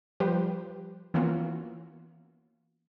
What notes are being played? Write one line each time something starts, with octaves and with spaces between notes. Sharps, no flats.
F3 G3 G4 B4 C5
E3 A#3 B3 C#4 F4 F#4